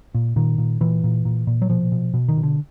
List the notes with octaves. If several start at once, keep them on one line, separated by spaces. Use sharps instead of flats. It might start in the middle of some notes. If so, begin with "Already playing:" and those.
A#2
A#2 D#3
A#2
A#2 E3
A#2
A#2
A#2
F#3
B2 F3
B2
B2
D#3
B2
D3